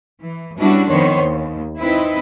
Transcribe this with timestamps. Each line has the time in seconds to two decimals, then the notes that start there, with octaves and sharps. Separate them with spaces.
0.21 E3
0.57 G3 B3 C#4 D4 E4 F#4
0.89 F2 D#3 B3 C5 C#5
1.18 D#2
1.79 C4 D#4 E4 B4